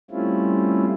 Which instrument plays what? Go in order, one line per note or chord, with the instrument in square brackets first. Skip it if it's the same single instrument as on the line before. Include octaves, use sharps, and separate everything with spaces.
[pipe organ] G3 A3 C4 C#4 E4 F4